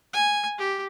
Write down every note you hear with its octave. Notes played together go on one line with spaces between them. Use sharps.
G#5
G4